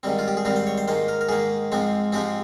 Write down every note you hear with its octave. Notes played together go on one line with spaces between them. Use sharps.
G#2 D#3 G3 C4
F4
G4
G#4
G#2 D#3 G3 C4 A#4
C5
C#5
C5
G#2 D#3 A#3 C5
A#4
A#4
G#2 D#3 A#3 G#4
G#2 F3 G#3 C4
G#2 F3 G#3 C4 G4